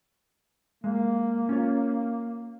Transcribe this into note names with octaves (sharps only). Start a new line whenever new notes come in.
G#3 A#3
C#4 F4 C#5